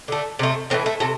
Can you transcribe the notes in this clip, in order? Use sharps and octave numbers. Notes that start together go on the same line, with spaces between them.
D3 A3
C3 A3
A2 E3 A3 C4
A3
C3 A3